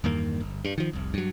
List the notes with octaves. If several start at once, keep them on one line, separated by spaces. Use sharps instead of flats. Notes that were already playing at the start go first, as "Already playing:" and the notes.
E2 G2 D#3 A#3
G1
G2
D#3 F3
F1 C2
G2 F#3